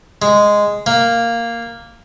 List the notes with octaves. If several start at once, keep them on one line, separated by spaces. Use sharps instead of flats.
G#3
A#3